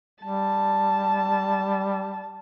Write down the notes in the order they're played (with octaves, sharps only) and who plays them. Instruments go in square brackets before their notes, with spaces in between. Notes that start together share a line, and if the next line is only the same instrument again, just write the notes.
[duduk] G3 [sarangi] A5